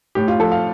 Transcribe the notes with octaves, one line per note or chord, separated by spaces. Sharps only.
A2 G4
F4
F3 A4
F5